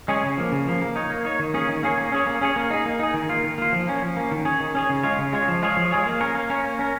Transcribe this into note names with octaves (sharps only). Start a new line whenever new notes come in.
G#3 C#4 G#4 C#5
C#3
F3 A#3
C#3
F3 A#3
A#3
D#4 C#5
A#3
D#4 C#5
D#3
A#3 C#4 G#4 C#5
D#3
A#3 C#4 G#4 C#5
A#3
C#4 G#4 C#5
A#3
C#4 G#4 C#5
A#3
D#4 G#4
A#3
D#4 G#4
D#3
A#3 F4
D#3
A#3 F4
F3
A#3 C#4
F3
A#3 C#4
D#3
C#4 G#4 C#5
D#3
C#4 G#4 C#5
C#3
G#3 F4 C#5
C#3
G#3 F4 C#5
F3
G#3 F4 G#4 C#5
F3
G#3 F4 G#4 C#5
A#3
C#4 A#4 C#5
A#3
C#4 A#4 C#5
A#3
C#4 A#4